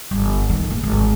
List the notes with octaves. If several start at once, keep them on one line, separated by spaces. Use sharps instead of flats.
G1
D#3
A#1
G#1